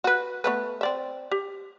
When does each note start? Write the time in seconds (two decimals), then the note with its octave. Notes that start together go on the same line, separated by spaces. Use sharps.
0.04 F#4 B4
0.44 A3 B3 B4
0.81 C4 D5 E5
1.31 G4